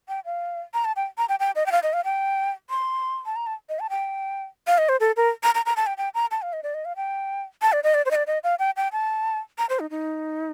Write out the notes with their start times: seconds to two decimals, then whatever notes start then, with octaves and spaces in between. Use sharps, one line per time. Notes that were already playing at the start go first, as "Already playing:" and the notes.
0.09 G5
0.25 F5
0.74 A#5
0.85 A5
0.96 G5
1.18 A#5
1.29 G5
1.40 G5
1.56 D#5
1.66 G5
1.72 F5
1.83 D#5
1.93 F5
2.05 G5
2.70 C6
3.26 A5
3.36 A#5
3.47 A5
3.69 D#5
3.80 A5
3.90 G5
4.67 F5
4.78 D#5
4.89 C5
5.00 A4
5.17 A#4
5.43 A#5
5.55 A#5
5.66 A#5
5.77 A5
5.87 G5
5.98 G5
6.14 A#5
6.31 A5
6.42 F5
6.53 D#5
6.63 D5
6.74 D#5
6.85 F5
6.96 G5
7.62 A5
7.72 D5
7.84 D#5
7.94 D5
8.06 C5
8.11 D#5
8.16 D5
8.27 D#5
8.44 F5
8.59 G5
8.77 G5
8.92 A5
9.58 A#5
9.69 C5
9.80 D#4
9.90 D#4